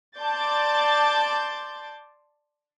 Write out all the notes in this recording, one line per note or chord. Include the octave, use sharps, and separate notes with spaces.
D5 A5 C6 D6 G6 A6